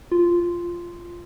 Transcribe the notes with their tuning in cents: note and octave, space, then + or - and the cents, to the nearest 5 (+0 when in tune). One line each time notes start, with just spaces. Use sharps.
F4 -10